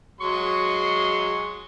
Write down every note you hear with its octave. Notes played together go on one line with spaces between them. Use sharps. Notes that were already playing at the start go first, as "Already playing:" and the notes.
F#3 G#3 C6 C#6